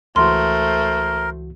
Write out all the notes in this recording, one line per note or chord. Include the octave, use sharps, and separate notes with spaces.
C#2 E3 A3 F#4 A#4 C5 C6